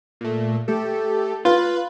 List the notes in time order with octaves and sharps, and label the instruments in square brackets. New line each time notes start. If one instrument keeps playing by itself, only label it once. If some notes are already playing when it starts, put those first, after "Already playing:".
[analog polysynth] A#2 A3
A3 G4 A4
[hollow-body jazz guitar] F4 [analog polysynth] B4